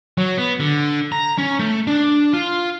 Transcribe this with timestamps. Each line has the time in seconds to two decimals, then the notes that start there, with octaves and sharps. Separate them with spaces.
0.18 F#3
0.38 B3
0.60 D3
1.12 A#5
1.38 C#4
1.59 A3
1.87 D4
2.33 F4